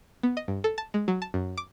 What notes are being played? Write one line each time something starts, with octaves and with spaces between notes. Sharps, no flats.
B3
D#5
G2
A4
A5
G#3
F#3
A5
F#2
D6